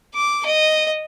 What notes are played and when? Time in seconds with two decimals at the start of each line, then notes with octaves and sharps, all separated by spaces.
0.14 D6
0.46 D#5